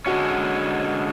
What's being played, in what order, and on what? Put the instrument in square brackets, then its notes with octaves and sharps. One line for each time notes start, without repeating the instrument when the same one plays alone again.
[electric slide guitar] D3 G#3 C#4 [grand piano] F#4